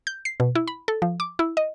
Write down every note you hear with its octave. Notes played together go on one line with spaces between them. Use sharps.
G6
C7
B2
E4
B5
A4
F3
D6
E4
D#5